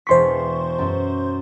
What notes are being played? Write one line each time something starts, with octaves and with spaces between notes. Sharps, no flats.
E1 E2 C5 C6 C#6 B6
F#2